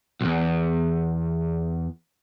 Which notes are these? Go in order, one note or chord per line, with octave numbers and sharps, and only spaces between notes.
B1 E2